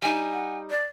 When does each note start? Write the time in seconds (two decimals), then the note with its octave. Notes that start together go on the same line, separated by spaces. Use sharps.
0.02 G3 D#4 G#5
0.32 F#5
0.71 D5